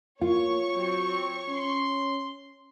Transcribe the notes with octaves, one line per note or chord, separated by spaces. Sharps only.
A#3 F4 C#5 C#6
F#3 C4
C#4 C6